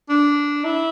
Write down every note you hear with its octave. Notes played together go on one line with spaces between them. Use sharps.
D4
E4